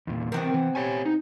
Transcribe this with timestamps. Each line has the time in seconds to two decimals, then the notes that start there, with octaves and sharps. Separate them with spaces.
0.07 E2 A#2
0.32 C3 E3 B3 C4 A#4
0.54 E3
0.75 G4 C#5 G#5
1.05 D#4